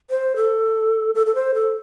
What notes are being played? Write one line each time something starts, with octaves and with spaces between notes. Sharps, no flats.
C5
A4
A4
A4
C5
A4